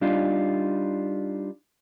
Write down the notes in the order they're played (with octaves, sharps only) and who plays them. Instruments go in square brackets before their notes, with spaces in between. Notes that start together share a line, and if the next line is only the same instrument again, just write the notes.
[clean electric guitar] G3 D4 D#4 F4